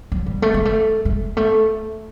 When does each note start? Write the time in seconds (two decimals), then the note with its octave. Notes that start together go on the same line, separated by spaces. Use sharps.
0.12 F#3
0.26 G3
0.42 A3
0.54 G#3
0.65 A3
1.05 G#3
1.37 A3